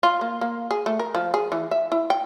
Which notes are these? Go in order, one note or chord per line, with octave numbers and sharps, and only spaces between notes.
F4
A#3
A#3
G#4
A3
A#4
F3
G#4
E3
E5
E4
G5